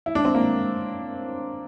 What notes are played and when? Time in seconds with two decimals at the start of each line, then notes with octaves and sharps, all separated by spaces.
0.06 E4
0.15 D4
0.25 C4
0.35 A#3